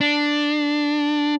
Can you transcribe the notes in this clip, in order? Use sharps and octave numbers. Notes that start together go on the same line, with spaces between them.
D4